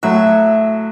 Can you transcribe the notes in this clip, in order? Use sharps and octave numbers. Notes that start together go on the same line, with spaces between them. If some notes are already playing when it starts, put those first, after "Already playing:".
A2 F#3 F#4 E5